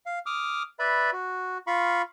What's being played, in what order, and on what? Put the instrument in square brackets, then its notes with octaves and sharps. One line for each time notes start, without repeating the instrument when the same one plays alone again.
[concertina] F5
D6 D#6 F6
B4 D5 E5 B5
F#4
F4 F5 B5 C#6